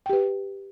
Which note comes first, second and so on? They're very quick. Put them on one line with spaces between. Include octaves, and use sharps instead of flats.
G5 G4 B4